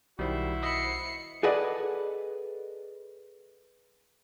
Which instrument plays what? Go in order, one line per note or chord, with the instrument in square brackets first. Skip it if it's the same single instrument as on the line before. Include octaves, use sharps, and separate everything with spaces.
[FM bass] B1 [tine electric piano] D#3 G3 [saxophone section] E4 F#4 C5
[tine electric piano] D#5 E5 B5 [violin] C7 C#7
[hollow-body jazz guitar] G#4 A4 B4 D5 D#5 F#5